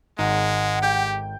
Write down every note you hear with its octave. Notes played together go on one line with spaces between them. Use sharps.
G#1 G#3 D#4 F#5
G4 G5